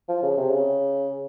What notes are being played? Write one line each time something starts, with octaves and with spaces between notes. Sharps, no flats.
F3
C#3
C3
C#3